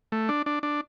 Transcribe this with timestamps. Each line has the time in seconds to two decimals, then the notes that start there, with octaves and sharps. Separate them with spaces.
0.12 A3
0.29 D4
0.46 D4
0.63 D4